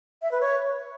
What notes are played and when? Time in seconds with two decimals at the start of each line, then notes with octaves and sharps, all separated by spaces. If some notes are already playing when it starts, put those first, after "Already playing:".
0.22 E5
0.31 B4
0.41 C#5